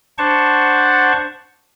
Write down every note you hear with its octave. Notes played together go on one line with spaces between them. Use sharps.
D4 C5 F#5 A5 C#6